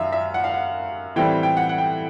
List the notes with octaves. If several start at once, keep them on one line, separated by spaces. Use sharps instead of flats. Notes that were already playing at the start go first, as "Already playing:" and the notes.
Already playing: F#2 D#3 E5 F5
E5
F#5
F5
F#5
A2 E3 G3 C4 G5
G5
F#5
F#5
G5